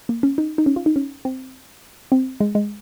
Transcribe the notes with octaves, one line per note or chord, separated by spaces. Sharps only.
A#3
C#4
D#4
D#4
C#4
F4
D#4
C#4
C4
C4
G#3
G#3